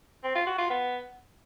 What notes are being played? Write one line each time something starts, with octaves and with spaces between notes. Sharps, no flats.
C4
F4
F#4
F4
B3